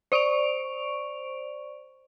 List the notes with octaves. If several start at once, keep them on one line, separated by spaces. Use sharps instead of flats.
C5 D5 C#6 D7 F7